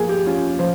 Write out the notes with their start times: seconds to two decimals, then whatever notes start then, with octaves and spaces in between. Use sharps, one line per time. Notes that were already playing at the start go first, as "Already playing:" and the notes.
Already playing: F3 A#3 G#4
0.09 G4
0.26 C#4 F4
0.59 F3 C5